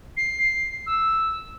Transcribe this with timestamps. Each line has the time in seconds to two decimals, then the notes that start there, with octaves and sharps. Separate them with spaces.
0.17 C7
0.87 E6